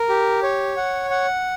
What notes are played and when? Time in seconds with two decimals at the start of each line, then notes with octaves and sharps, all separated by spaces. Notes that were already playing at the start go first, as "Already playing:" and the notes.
Already playing: A#4
0.09 G4
0.43 C#5
0.77 F#5
1.10 F#5